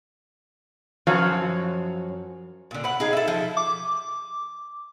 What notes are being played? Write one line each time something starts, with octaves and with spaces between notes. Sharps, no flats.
F#2 F3 F#4 C#5 F5
A#2 D3
B4 F#5
D#4 G#4 F5
A4 E5
F3
D6